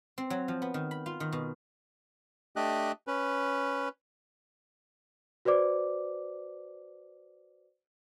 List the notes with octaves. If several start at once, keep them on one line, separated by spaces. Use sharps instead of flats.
C4
F#3
F3
B3
D#3
B5
F4
D#3
B2
A3 D4 G4 D#5 F#6
C#4 B4
F#4 B4 C5 D5 D6